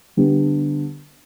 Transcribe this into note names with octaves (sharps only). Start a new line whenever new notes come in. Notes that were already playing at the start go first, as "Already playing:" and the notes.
D3 G3 B3 D4 G4